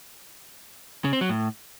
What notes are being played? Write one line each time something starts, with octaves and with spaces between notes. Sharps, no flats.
C#3
C4
F#3
A2